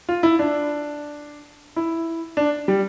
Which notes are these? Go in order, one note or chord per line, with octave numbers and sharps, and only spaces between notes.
F4
E4
D4
E4
D4
G3